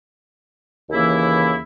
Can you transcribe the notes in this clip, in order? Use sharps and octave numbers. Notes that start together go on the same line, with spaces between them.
D#2 C#3 E3 A#3 E4